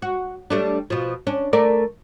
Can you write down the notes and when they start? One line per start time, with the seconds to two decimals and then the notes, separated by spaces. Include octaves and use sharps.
0.02 F#4
0.50 G3 A3 D4
0.90 B2 F3
1.27 C#4 D4
1.53 A3 A#4 D5